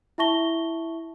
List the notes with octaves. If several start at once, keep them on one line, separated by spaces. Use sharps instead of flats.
E4 E5 A5 C#6 A#6 G7